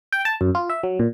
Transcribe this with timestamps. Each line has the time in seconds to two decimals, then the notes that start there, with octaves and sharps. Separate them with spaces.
0.12 G5
0.25 A5
0.41 F#2
0.55 F4
0.70 E5
0.83 F#3
0.99 A#2